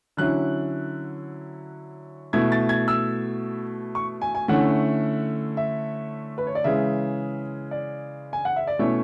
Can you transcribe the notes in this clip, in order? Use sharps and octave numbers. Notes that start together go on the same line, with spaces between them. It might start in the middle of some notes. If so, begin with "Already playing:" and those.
D3 F#3 C#4 E4 F#6
B2 A3 E4 G#6
A6
G#6
E6
C#6
G#5
G#5
D3 A3 C#4 E4 F#5
E5
B4
C#5
D5
C#3 E3 G#3 E5
D5
G#5
F#5
E5
D5
B2 A3 C#4 E4 C#5